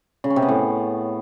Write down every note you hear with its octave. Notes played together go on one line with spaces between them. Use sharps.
C#3
C#4
C3
B3
A2